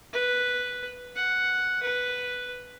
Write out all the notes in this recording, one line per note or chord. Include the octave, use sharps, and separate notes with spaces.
B4
F#5
B4